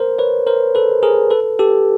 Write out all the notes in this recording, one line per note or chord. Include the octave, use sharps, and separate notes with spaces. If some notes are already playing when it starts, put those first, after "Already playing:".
Already playing: A#4 C5
B4 C#5
A#4 C5
A4 B4
G#4 A#4
A4 B4
G4 A4